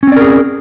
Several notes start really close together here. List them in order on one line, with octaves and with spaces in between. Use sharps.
C#4 C4 D5 A#4 G#4